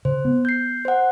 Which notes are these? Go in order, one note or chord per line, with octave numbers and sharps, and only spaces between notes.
C#3 C5
B3
G6 C7
C5 F#5